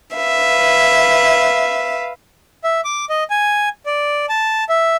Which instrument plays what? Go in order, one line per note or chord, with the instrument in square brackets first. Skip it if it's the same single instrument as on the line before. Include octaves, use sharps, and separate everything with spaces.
[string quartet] B4 E5 F5
[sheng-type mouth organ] E5
D6
D#5
G#5
D5
A5
E5